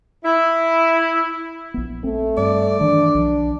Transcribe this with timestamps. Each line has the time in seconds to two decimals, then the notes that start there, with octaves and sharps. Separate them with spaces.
0.24 E4
1.74 A#1 B3
2.04 A3 C4
2.38 G2 D5
2.81 D#3 E3 D4
3.15 B1 F3